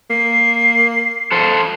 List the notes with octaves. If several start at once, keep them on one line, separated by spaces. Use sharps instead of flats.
A#3 C7
A4 C5